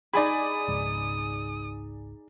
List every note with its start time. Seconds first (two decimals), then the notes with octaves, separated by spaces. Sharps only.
0.14 D#4 G#4 D5 G#5 B5 D#6
0.68 G#1 C#2 G#2